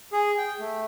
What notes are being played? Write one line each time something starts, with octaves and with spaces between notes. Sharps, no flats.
G#4
G5
A3